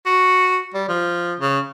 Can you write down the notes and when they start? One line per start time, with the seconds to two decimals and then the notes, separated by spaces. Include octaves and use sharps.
0.06 F#4
0.74 G3
0.89 F3
1.40 C#3